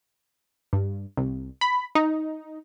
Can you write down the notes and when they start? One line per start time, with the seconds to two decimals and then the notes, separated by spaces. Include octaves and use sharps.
0.73 G2
1.17 C2
1.61 B5
1.95 D#4